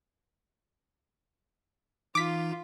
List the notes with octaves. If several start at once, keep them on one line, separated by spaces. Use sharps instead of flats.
E3 D#4 F4 D6 B6